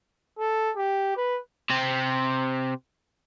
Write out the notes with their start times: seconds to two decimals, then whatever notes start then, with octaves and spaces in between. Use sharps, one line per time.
0.39 A4
0.76 G4
1.17 B4
1.70 C3 C4